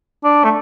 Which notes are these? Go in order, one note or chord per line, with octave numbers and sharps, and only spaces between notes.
D4
A3